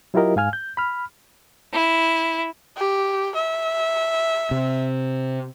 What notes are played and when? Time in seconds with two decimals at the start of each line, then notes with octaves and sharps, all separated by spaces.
0.14 F#3 E4 F4 G4 A#4 D#5
0.36 G#2 F5 G#5 F6
0.53 G6
0.77 B5 F6
1.73 E4
2.76 G4
3.35 E5
4.51 C3